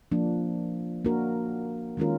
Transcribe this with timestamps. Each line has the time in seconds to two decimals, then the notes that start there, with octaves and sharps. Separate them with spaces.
0.12 F3 A#3 D4
1.05 A#3 D4 F#4 A#4
1.97 D#3 G#3 C#4 F4 A#4